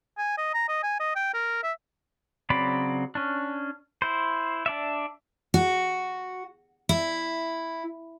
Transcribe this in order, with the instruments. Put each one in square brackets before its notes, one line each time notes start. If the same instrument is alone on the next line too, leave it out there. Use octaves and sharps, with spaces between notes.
[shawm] G#5
D#5
A#5
D#5
G#5
D#5
G5
A#4
E5
[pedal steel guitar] C#3 F#3 C4 D5 B5
C#4 D4
E4 C5
D4 D5 E5
[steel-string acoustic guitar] F#4
E4